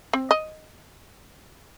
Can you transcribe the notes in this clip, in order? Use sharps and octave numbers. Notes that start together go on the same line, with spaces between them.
C4
D#5